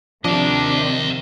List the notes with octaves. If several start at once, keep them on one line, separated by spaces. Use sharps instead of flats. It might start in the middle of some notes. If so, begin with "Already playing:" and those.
C3 D#3 F3 D4 D#5 F5